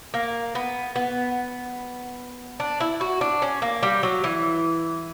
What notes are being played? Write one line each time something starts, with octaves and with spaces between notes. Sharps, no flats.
A#3
B3
B3
D4
E4
F#4
D4
C#4
A#3
G3
F#3
E3